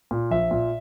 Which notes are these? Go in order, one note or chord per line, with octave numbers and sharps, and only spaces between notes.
A#2
A#1 E5
A#2